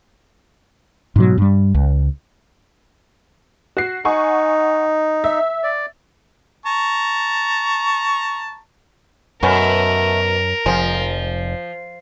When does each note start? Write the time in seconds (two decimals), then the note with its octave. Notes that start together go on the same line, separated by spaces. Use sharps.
1.16 G#2 B2 F#3
1.38 G2 G3
1.74 C#2
3.77 F#4 C7
4.05 D#4 F#5 G#5 C#6
5.24 E5
5.63 D5
6.66 A5 A#5 C#6
9.43 F#2 B2 A3 B3 C#4 A#4
10.66 F1 F3 G#3